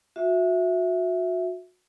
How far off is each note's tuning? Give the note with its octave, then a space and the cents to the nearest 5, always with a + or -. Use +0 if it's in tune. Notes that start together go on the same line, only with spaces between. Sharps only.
F#4 -30 E5 +0